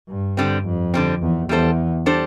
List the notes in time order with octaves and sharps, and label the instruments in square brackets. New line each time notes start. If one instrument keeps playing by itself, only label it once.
[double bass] G2
[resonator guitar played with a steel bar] D3 G3 C4
[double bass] F2
[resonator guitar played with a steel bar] D3 G3 C4
[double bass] E2
[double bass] E2 [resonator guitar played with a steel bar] G3 D4 A4 C5
[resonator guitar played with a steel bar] G3 D4 A4 C5